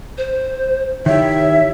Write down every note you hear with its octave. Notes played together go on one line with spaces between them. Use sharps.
C5
D#3 E4 G4 C#5 E5